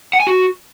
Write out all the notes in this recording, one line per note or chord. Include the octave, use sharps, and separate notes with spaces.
F#5
G#5
F#4